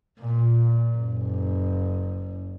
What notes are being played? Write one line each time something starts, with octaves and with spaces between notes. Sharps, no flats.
A#2
F#1